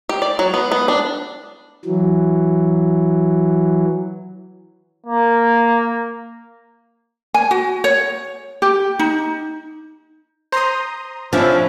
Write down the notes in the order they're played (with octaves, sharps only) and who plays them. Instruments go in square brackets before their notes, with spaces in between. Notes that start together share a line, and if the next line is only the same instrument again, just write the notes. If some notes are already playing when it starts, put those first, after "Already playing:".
[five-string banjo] G4
D5
F#3
B3
B3
D4
[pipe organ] E3 F#3
[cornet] A#3
[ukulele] G#5
F#4
C#5
G4
D#4
[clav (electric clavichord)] C5 [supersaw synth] A#5 C6 D#6
[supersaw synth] C3 D4 E5 [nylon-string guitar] F3 [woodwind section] C#4 E4